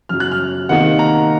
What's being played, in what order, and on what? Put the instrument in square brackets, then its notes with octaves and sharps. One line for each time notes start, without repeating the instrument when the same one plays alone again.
[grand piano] F#2 C#3 F#3 F6
F#6
F6
C3 D#3 A#3 D#4 F#5
A#5